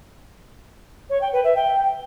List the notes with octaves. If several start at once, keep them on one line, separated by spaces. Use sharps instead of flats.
C#5
G5
B4
E5
G5